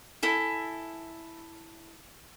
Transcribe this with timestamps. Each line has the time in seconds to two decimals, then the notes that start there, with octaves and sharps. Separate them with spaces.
0.23 E4 A4 G#5